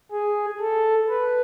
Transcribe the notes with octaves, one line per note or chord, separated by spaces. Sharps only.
G#4
A4
B4